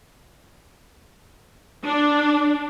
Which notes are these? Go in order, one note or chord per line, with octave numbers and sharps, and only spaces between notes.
D4